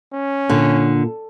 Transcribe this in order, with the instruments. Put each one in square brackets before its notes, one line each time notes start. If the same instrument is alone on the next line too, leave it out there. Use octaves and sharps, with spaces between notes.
[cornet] C#4
[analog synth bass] A#2 [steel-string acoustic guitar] D3